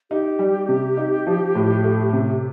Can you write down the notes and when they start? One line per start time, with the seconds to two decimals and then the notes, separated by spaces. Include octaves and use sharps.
0.11 D#4 G4
0.39 G3
0.69 C3
0.97 D#4
1.27 F3
1.55 A2
1.84 A3
2.13 C3